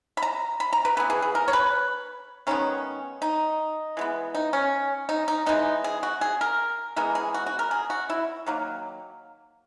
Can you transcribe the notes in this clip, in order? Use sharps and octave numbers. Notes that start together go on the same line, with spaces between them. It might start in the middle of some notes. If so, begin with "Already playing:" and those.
B5
A#5
B5
A#5
B4
E3 B3 B4
G#4
G#4
A#4
C#5
B4
D#3 G#3 B3 C#4
D#4
E3 G#3 B3
D#4
C#4
D#4
D#4
E3 G#3 B3 D#4
G#4
F#4
G#4
A#4
E3 G#3 B3 A#4
G#4
F#4
F#4
A#4
G#4
F#4
E4
D#3 F#3 A#3